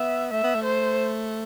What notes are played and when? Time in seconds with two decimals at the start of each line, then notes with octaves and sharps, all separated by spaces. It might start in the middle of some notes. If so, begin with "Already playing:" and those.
Already playing: B3 E5
0.32 A3 E5
0.43 B3
0.55 A3
0.64 C5